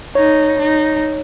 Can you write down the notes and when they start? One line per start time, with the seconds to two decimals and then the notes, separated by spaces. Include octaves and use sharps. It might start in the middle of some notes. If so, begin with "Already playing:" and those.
0.15 D#4 C#5
0.59 D#4